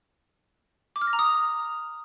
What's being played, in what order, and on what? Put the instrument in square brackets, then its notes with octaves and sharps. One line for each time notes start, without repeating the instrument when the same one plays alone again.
[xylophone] D6
F6
A#6
A#5
D#6